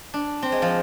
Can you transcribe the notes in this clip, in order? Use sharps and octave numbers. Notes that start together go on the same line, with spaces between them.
D4
C4
G#3
F3